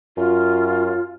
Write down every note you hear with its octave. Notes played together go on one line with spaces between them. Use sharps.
F#2 F4